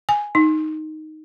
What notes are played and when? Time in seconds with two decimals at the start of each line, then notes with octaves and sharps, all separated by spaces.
0.09 G#5
0.35 D#4